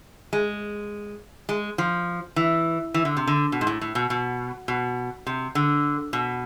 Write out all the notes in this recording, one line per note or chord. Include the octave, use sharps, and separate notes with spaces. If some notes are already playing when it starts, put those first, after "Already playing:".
G#3
G#3
F3
E3
E3
D3
C3
D3
B2
G#2
A2
A2
B2
B2
B2
C3
D3
B2